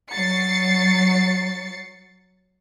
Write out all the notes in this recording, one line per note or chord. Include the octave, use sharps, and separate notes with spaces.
F#3 A6 C7 C#7